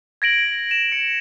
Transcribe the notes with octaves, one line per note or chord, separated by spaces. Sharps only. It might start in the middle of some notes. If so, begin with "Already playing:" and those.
G#6 A#6 D7 F#7
E7
C#7